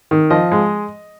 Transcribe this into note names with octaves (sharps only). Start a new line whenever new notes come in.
D#3
F3 D#5
G#3